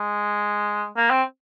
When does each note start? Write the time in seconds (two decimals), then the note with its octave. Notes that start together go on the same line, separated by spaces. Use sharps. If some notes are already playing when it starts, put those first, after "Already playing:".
Already playing: G#3
0.96 A#3
1.10 C4